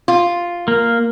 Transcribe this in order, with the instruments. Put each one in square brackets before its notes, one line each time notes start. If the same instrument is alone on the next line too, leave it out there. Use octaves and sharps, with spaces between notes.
[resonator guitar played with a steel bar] F4
[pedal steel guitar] A#3 [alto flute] A#4